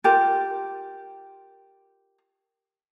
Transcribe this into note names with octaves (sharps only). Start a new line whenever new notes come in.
F4 G4 A#4